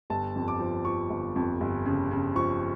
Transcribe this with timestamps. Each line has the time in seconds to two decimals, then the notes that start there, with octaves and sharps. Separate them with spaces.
0.10 G1 A5
0.36 F2
0.48 D6
0.60 F3
0.85 F3 C#6
1.10 G1
1.36 F2
1.61 G1
1.86 C#3
2.11 C#3
2.35 F3 C#6